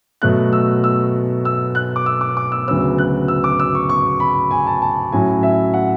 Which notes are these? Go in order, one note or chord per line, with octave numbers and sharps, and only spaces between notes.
B2 F#3 A3 F#6
E6
E6
E6
F#6
D6
E6
D6
D6
E6
D2 C#3 F#3 B3 E6
F#6
E6
D6
E6
C#6
C#6
B5
G#5
A5
A5
A2 F#3 C#4 G#5
E5
F#5